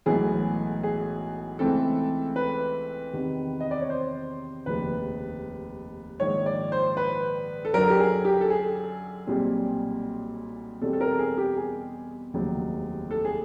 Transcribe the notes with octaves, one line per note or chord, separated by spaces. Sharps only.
B1 A2 E3 G#3 B3 G#4
G#4
C#2 C#3 E3 A3 C4 A4
B4
E2 C3 D#3
D#5
D5
C#5
C5
F1 D#2 C#3 B4
A#1 G#2 D#3 C#5
D5
C5
B4
A4
F#2 D3 F#3 A#4
G4
G#4
G4
A4
G#4
B1 A#2 G3 C4 G#4
E2 B2 G3 C4 A4
A4
A#4
A4
G#4
G4
G#4
F1 D#2 C#3 F#3
A4
G#4